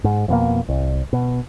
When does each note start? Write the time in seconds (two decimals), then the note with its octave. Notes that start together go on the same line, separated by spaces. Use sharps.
0.04 G#2
0.28 F2 B2 A#3
0.69 C2
1.13 B2